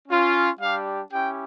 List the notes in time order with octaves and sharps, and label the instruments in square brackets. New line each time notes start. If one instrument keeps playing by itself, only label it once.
[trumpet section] C#4 F4
G3 D4 G4 F5
C#4 E4 G4 G5